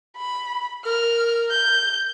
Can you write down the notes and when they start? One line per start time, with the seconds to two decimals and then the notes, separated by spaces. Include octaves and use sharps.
0.17 B5
0.86 A#4 F6
1.51 G6